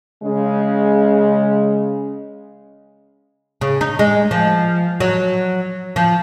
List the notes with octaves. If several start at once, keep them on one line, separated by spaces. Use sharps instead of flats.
C#3 G#3
C#3
D#4
G#3
F3
F#3
F3